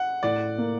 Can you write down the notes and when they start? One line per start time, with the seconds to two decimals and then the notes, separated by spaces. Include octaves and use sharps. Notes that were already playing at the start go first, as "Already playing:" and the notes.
Already playing: F#5
0.23 A2 D5
0.58 A#3